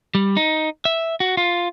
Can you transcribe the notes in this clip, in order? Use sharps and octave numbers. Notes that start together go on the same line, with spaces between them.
G3
D#4
E5
F#4
F4